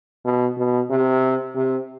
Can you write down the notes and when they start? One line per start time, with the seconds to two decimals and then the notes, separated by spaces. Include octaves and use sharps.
0.25 B2
0.58 B2
0.90 C3
1.55 C3